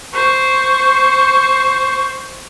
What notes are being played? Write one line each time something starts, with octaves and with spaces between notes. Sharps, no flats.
C5 C#6